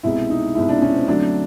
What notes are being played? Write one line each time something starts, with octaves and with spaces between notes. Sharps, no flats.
C2 B2 G#3 E4
D#4
C2 B2 G#3 E4
D4
C#4
C4
F2 D3 F#3 A3 D4